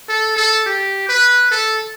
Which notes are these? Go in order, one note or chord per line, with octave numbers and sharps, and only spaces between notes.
A4
A4
G4
B4
A4